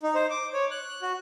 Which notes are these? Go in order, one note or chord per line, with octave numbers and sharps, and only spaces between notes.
D#4
C5
D6
C#5
F#6
F#4